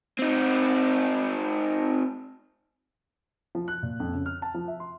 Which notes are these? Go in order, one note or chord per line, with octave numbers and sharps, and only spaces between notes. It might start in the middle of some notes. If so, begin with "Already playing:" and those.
C4 D#4
F3
F#6
A#2
F2
C#3
F6
A5
F3
E5
C6